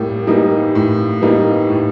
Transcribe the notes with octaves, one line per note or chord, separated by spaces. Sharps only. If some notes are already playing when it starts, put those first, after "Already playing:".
Already playing: A2 G3 A#3
E3 G3 A#3 D#4
A2
E3 G3 A#3 D#4
A2